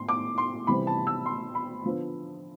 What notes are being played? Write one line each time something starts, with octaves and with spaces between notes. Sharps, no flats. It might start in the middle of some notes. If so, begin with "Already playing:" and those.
Already playing: A2 C6
D6
C6
C3 E3 G3 C4 B5
A5
E6
C6
B5
D3 F3 B3